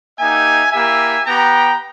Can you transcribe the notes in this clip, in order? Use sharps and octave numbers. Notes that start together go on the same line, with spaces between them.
A#3 D#4 G4 E5 G#5
A#3 E4 G4 E5 G#5
B3 G4 G5 A#5